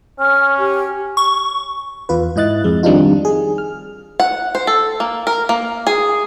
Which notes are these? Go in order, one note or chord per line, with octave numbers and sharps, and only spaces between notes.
C#4 F6
G4
C#6
E2 F4 B4
G#2 E4 D#5 F#6 A6
F2 G#3
D#3 G3 C4 D4 D#4 F4
G#4
F6
F#5
C5
A4
A#3
A#4
A#3
G#4